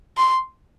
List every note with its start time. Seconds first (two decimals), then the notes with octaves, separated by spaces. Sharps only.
0.17 C6